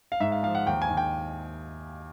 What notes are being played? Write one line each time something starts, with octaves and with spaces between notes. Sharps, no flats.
F5
G#2 E5
F5
F3 F5
F#5
D#2 G5
G#5
D#2
G5